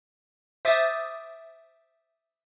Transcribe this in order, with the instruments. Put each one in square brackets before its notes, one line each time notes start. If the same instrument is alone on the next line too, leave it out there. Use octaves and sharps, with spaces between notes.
[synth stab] C5 E5 D6 D#6 A6